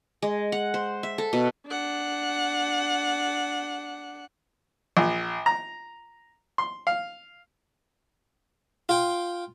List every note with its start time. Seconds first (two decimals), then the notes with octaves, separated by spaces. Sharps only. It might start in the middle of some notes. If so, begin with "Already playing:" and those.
0.22 G#3
0.52 F#5
0.74 C5
1.03 E5
1.18 A4
1.33 B2
1.67 D4 F#5
4.97 A#1
5.46 A#5
6.58 C6
6.87 F5
8.89 F4 G5